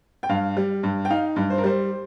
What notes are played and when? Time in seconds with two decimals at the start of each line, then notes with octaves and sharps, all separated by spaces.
0.23 G5
0.29 G2 F5
0.57 G3
0.83 G2
1.05 G5
1.10 D#4 F5
1.36 G2
1.50 C5
1.58 A#4
1.64 G3 C5